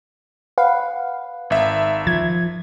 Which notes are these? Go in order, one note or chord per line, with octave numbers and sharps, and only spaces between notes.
B4 F5 F#5
G#1 E5
F3 G#6